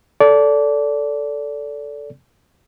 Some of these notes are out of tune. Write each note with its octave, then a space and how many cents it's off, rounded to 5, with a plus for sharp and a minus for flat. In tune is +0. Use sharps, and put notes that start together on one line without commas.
A4 +0 D5 -25